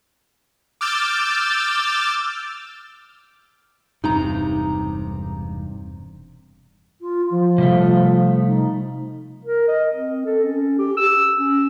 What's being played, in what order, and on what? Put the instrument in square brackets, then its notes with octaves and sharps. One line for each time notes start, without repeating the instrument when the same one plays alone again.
[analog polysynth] D6 E6 F6 G6 A6
[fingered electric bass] E1 G2 C3 [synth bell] D#4 A#5
[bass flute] F4
F3
[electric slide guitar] C3 G3 A3
[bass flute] D#4
[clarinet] A#4
D#5
C4
A4
C#4
G4
E6
C#4